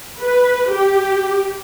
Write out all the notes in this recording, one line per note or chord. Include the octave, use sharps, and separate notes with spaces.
B4
G4